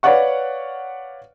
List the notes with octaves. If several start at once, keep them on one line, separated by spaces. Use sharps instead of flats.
B4 C#5 D5 F5 F#5 C#6